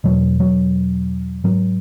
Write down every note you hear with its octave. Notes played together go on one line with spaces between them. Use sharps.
E2 B2 F#3
F#3
G#2 F#3